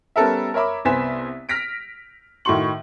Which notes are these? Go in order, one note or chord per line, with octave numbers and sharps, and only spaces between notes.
G3 B3 C#4 A4 A#4 E5
A#4 C#5 E5 B5 D6
C2 B3 C5 G#5 B6 E7
F6 A#6 B6 D7
A2 D#3 F#4 C6 C#6 F#7